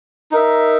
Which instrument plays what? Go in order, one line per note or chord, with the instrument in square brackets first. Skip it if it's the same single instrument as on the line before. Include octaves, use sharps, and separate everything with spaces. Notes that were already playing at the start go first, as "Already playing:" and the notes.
[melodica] D#4 A#4 E5